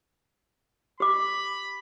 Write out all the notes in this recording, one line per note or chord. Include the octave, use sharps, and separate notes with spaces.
G4 B5 D6